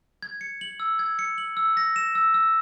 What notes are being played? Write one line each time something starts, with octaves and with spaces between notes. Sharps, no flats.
G#6
C#7
F#7
E6
G#6
C#7
F#7
E6
A#6
E7
E6
E6